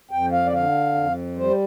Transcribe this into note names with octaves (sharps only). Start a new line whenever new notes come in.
F2 G5
F5
D5
D3 F5
F2
G3 C5